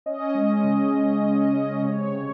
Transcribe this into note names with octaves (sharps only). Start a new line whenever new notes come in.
C#4 D#5
G#3
C#3
C#3
G#3
C#3
C3 C#5
C3